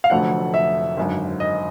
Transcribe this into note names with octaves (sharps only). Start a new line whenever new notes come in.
F5
F1 F2 D3 F#3 A3 F#5
E5
G#1 F#2 D3
D#5